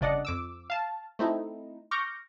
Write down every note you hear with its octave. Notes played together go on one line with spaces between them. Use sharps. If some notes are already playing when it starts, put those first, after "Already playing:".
G1 C#3 D4 D5 D#5 F#5
F2 D6 E6
F5 A5
A3 C4 D#4 E4
C#6 D6 F6 G6 A#6